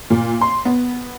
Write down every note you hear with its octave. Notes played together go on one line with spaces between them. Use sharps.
A#2
C6
B3